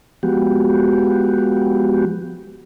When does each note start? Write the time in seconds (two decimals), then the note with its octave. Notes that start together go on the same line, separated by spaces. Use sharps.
0.23 F3 G#3 B3 F#4 G4